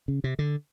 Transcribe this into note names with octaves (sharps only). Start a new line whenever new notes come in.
C#3
C3
D3